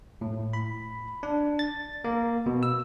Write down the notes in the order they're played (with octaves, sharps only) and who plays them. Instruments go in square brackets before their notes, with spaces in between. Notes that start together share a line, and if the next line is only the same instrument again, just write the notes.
[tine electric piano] A2
B5
D4
A6
A#3
B2
E6